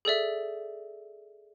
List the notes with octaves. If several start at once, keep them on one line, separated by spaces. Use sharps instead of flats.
G#4 A4 D5 E5